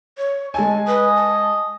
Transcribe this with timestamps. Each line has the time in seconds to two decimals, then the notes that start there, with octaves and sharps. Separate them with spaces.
0.18 C#5
0.54 G#3 G#5 A5
0.87 B4 D#5
1.16 A5